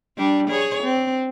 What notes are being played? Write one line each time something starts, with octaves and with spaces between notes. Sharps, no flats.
G3 D4
G#4 C#5
C4